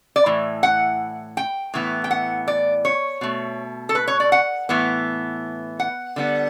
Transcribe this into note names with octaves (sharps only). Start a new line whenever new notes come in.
D5
A2 E3
F#5
G5
A2 E3 B3
G5
F#5
D5
C#5
B2 A3
A4
B4
C#5
D5
F#5
A2 E3 B3
F#5
D3 G3 B3